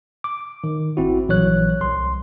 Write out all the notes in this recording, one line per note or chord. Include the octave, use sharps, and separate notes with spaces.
D6
D#3
G#1 C4 E4 F#4
A#1 E3 F#3 C#5 F#6
C2 C6